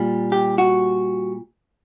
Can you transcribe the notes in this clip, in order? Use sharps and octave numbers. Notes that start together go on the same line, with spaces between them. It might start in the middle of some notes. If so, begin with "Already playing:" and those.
Already playing: A#2 G3
G4
F#4